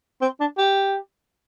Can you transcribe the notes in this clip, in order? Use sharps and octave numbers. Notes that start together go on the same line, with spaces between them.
C4
D4
G4